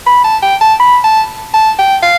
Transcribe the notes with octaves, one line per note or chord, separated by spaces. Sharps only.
B5
A5
G5
A5
B5
A5
A5
G5
F5